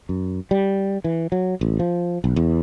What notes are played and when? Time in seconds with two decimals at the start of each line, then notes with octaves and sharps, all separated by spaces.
0.09 F#2
0.51 G3
1.04 E3
1.32 F#3
1.61 A1
1.80 F3
2.24 B1
2.36 E2